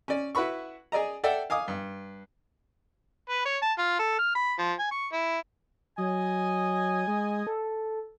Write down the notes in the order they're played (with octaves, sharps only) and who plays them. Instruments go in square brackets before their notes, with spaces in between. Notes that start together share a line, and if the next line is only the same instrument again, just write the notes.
[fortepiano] C#4 D5
E4 F#4 B4 B5 C#6
G#4 D5 D#5 A#5
A4 D5 E5 F#5 G5
F5 G#5 D6 D#6
G2
[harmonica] B4
C#5
A5
F4
A4
F6
B5
F3
G#5
C#6
E4
[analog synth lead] F#3 [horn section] D#5 G#5
[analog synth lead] G#3
A4